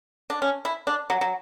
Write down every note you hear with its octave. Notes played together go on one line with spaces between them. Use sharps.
D4
C#4
E4
D4
F#3
F#3